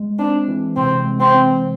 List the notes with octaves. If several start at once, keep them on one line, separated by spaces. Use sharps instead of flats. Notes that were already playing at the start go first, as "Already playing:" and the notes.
Already playing: G#3
C4 D4
E3
C3 C4
G#3
C4
C4